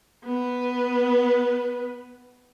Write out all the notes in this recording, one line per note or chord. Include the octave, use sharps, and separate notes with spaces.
B3 B4